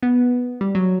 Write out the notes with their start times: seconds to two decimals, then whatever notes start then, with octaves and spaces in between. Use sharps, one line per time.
0.03 B3
0.61 G3
0.75 F#3